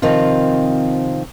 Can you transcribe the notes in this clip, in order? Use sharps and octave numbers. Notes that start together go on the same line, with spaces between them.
C3 D#3 F3 C4 F4